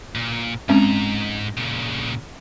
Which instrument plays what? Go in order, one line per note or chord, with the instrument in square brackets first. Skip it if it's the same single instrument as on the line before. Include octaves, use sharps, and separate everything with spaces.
[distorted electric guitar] A#2
[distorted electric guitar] G#2 A#5 [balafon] G#3 C4 C#4
[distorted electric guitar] A#2 C#3